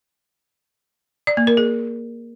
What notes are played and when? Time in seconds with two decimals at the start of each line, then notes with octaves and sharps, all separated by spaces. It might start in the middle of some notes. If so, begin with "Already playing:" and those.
1.27 D5
1.37 A#3
1.47 A#4
1.57 G#4